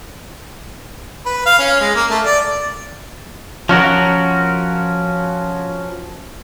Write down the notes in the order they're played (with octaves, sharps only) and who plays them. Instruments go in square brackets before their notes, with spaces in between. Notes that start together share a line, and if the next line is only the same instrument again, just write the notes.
[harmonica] B4
F5
C#4
G#3
A#3
A3
D5
[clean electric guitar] F3 C#4 F#4 A#4